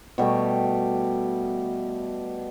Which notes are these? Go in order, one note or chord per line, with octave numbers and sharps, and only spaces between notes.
B2 G3 A3 G5